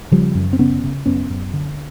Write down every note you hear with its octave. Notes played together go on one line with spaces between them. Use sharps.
C#3 F3 G3
F#2
C4
C#3 B3 C#4
C#3
F#2 B3 C#4
F#2
D3